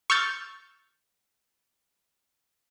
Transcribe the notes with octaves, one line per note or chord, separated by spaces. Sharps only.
C#6 E6 F6 G6 A6